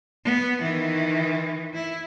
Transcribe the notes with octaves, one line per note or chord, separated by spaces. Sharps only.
B3
D#3 E3
E4